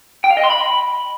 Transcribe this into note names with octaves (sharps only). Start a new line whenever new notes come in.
G5
F5
D#5
C6
B5